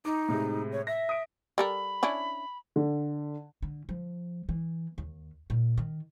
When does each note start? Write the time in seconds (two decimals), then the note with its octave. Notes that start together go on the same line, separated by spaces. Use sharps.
0.05 D#4 D6
0.28 A2 C3 G#3
0.72 C#5
0.87 E5 A#6
1.09 D#6 D7
1.58 G3 A4 A#4 B5
2.03 C#4 D4 E4
2.76 D3
3.62 D3
3.89 F3
4.49 E3
4.98 D#2
5.50 A#2
5.78 D#3